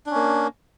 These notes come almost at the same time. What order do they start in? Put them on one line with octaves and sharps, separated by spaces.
D4 C#4 A#3